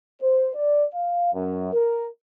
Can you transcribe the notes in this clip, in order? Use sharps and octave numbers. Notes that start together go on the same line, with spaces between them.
C5
D5
F5
F#2
A#4